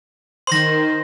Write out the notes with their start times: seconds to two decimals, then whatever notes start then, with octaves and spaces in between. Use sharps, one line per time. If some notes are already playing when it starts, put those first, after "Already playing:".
0.47 D#3 C5 C6 A#6